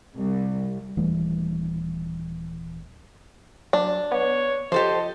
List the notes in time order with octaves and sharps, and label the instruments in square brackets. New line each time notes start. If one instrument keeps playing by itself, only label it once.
[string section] C2
[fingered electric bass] D#1 E3 G3 A3
[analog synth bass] F#3 [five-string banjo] D4
[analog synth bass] B3 [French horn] C#5
[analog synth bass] F3 [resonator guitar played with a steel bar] G4 A4 C5 [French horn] D#5